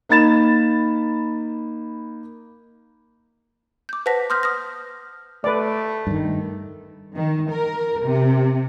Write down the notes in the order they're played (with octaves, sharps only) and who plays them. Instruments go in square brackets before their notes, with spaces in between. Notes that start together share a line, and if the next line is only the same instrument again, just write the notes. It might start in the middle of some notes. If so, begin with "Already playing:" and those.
[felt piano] A#3 D#4 B5 A6 E7
[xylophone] D6 G6
B4 C5 F#5 A5 A#6 B6
C6 D#6 F6 G6 A#6
D#6 F6 A#6
[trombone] A3 [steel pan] B4 D5
[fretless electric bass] G2 D#3
[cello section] D#3
A#4
C3